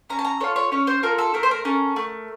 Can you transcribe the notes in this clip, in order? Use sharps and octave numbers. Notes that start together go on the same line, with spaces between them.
C#4 A#5
A5
A#5
F4 A4 C#5
C#5
C#4 C#5
C5
F4 A4 A#4
A4
A3 A#4
C5
A#4
C#4 A4
A3